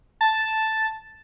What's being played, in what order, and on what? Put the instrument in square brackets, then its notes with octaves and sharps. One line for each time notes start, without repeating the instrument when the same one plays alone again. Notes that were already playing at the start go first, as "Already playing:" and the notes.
[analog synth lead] A5